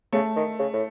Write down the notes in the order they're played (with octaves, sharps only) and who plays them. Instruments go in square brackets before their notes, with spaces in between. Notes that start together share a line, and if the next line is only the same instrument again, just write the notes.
[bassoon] C#3 [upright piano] A3
[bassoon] D#3
C#3
A2